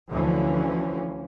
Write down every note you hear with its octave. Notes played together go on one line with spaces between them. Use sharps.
D2 D3 E3 F3 C#4